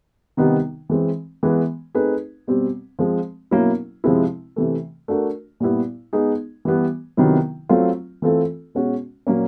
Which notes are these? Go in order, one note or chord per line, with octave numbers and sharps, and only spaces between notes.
C3 D#3 G3 B3 D#4
E3 G#3 C4
E3 G#3 B3
A3 C4 D#4 G#4 B4
B2 G3 C4
F3 G#3 C4
B2 F#3 A#3 C#4 E4
C3 F3 G#3 C4 E4
C3 E3 A3
A3 D4 F#4 A#4
A#2 G3 B3 E4
G#3 B3 D#4 G#4
E3 G3 B3
C3 D#3 F#3 B3 E4
F#3 A3 C4 F4
E3 A3 C4 F4 A4
B2 G#3 C#4 F#4
A#2 F#3 A#3 C#4